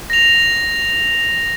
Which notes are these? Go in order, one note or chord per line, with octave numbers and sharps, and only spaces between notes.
A#6 F7